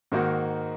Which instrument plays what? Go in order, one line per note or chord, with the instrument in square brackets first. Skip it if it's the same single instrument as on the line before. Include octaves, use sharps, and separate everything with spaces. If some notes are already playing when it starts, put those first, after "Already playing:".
[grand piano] G#2 D#3 A#3 D#4 F#4